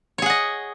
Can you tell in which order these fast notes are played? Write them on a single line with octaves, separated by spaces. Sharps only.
C#5 G#4 F#5 D#5